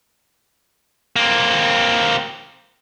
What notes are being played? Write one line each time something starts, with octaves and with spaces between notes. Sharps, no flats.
A#3 C4